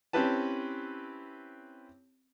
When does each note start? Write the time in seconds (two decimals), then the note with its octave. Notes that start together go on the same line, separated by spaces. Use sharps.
0.13 C4 C#4 E4 G4 B4 A5